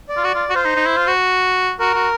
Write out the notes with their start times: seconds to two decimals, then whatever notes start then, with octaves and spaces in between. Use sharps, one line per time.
0.09 D5
0.17 F4
0.24 F#4
0.35 F4
0.50 F#4
0.55 F4 C5
0.65 D#4
0.76 D#4
0.86 E4
0.97 F4
1.07 F#4
1.79 F#4 A#4
1.95 F#4